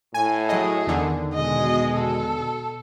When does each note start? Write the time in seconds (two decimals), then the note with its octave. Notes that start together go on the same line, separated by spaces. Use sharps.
0.14 A2 G#5
0.49 F#3 G#4 D#5
0.87 E2 D3 D#3
1.34 B2 G#3 D#5
1.95 A4